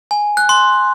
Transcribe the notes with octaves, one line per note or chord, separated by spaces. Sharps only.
G#5
F#6
C6